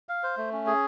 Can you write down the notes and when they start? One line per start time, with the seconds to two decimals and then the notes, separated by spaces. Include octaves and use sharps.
0.09 F5
0.23 C5
0.37 A3
0.52 C#4
0.66 G#4